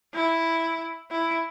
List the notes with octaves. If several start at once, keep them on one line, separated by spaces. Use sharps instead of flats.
E4
E4